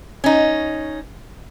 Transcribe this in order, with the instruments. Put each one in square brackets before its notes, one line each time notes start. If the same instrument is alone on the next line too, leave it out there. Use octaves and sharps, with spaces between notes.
[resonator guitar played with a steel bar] C#4 D#4